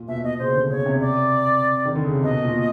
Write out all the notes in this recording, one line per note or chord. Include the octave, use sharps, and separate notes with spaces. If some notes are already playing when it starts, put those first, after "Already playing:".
Already playing: A#2
B2 E5
B2 D#5
C#3 C5
D3
C#3 C#5
C3
D5
D#3
D3
C#3
C3
B2 D#5
A#2